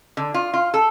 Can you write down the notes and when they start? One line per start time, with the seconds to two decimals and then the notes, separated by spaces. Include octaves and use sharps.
0.17 D3
0.34 F4
0.54 F4
0.74 A4